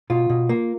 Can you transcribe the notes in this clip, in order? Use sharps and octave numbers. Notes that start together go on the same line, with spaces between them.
B2 F4
B2
A#3